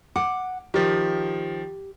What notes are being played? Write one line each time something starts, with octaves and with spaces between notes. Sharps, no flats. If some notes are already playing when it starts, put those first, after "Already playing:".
F#5 D6
D#3 F3 G4